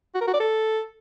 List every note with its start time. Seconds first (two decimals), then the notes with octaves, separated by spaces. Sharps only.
0.15 F#4
0.21 A#4
0.27 F#4
0.34 D5
0.40 A4